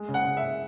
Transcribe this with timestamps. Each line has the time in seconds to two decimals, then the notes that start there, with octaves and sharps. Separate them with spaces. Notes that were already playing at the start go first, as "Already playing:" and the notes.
Already playing: G#3
0.09 C#3
0.14 F#5
0.25 C#3
0.37 E5
0.43 C#3